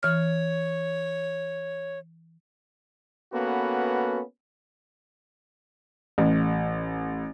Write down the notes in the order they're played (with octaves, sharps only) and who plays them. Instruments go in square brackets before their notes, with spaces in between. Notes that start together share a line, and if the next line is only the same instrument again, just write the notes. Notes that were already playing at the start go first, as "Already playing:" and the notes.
[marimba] E3 F6 [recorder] C#5
[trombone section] A#3 B3 C#4 F#4 A4 B4
[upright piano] A1